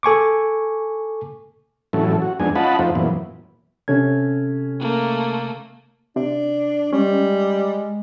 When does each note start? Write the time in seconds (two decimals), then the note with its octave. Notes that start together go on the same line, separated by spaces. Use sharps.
0.03 A4 G#5 C#6 D6
1.93 A2 E3 F#3 C#4 A4
2.22 F#4
2.40 F2 G#3 B3 D4 D#4 G#5
2.55 C#4 F4 D#5 F#5 A5 B5
2.79 F2 A3 D#4 F4 C5
2.95 F#2 A#2 E3 B3
3.88 C3 C#4 A4 G#6
4.80 A3 A#3
6.16 C3 D4
6.93 G3 G#3 C#4